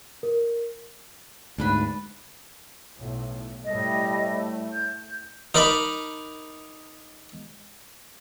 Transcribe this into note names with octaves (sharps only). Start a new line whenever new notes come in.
A#4
D2 G#2 D4 B4 B5
B1 A2
A2 G3 A3 D#5
G6
D#4 A#4 D5 B5